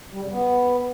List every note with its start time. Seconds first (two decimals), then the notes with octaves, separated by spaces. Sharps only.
0.12 G3
0.22 C#3
0.31 B3